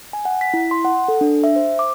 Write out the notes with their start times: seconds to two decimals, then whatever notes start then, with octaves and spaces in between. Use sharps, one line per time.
0.13 G#5
0.25 F#5
0.41 B6
0.54 E4
0.71 C6
0.85 F#5
1.08 A4
1.21 D4
1.44 E5
1.56 C5
1.79 D6